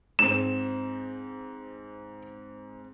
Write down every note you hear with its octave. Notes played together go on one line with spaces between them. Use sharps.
G#2 C4 E7